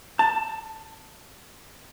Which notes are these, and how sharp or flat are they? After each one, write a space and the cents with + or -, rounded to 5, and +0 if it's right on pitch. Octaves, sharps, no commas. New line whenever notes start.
A5 +10